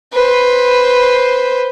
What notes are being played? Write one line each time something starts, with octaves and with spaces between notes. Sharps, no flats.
B4 C5